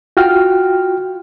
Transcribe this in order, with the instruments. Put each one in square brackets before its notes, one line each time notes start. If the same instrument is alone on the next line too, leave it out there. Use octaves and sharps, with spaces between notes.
[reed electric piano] F4 F#4 G5 F6